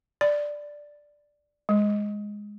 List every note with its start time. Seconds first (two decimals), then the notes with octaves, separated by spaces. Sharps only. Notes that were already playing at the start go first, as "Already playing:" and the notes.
0.21 D5
1.69 G#3